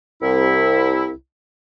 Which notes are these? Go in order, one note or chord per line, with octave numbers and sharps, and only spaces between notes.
C2 E4